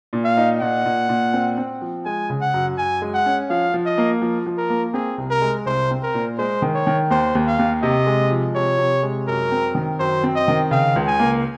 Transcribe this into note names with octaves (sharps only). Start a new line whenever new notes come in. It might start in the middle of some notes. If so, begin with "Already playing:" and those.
A#2
F5
D#4
A#2 F#5
A#2
A#2
C4
C4
F3
G#3 G#5
C#3
F#5
F#2
F#2 G#5
G#3
F#5
C#4
F3 F5
F3
D#5
A#3
F3
F3
A#4
A#3
C4 G#4
C2
A#4
G#3
C2 C5
C4
A#4
A#2
G#3 C5
D#3
C#5
D#3
D#2 C5
D#2
F5
D#2
C3 D#5
G#3
F3
C3 C#5
C3
G#3
F#2 A#4
C4
D#3
F#2 C5
C4
D#5
D#3
C#3 F5
C#2
G#5
A#3